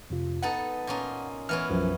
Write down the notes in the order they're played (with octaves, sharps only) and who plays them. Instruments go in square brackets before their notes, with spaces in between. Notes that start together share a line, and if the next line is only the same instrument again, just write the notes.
[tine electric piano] F2 C3 F4
[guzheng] B3 D#4 A4 [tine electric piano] F#5
[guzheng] A#2 C#4 D#4
[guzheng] E3 B3 C#4 [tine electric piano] F6
[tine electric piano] B1 F#2 F3